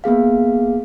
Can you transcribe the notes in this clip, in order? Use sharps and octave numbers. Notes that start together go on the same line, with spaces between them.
A#3 B3 G#4 F5